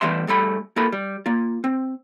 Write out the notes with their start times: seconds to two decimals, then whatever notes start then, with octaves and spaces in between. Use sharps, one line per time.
0.01 E3 G3 A3 B3 E5 C6
0.27 G2 G3 A3 B5
0.76 A#3 F4 A4 A#4 B5
0.92 G3
1.26 A#3 F4
1.64 C4